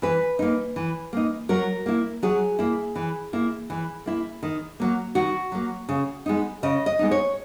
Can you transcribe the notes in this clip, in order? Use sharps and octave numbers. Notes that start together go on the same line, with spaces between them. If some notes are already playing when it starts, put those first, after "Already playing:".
E3 B4
A#3 D#4
E3
A#3 D#4
F#3 A#4
A#3 E4
F#3 G#4
A#3 E4
E3
A#3 E4
E3
A#3 E4
D#3
F#3 A#3
D#3 F#4
F#3 A#3
C#3
G#3 B3 D#4
C#3 D#5
D#5
G#3 B3 D#4
C#5